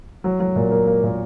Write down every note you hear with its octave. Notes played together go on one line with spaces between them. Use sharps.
F#3
F#3
A#2
A#3
A#3
A#2